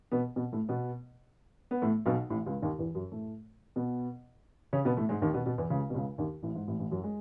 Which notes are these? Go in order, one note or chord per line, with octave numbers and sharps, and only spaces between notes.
B2 B3
B2 B3
A2 A3
B2 B3
B3
A2 A3
B1 B2
A1 A2
C#2 C#3
D#2 D#3
E2 E3
F#2 F#3
A2 A3
B2 B3
C#3 C#4
B2 B3
A2 A3
G#2 G#3
D#2 D#3
B2 B3
B2 B3
E2 E3
C#2 C#3
B2
C#2 C#3
D#2 D#3
A1 A2
G#2
A1 A2
A1 A2
F#2 F#3
G#3